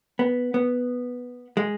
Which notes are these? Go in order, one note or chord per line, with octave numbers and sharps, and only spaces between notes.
B3
B3
G#3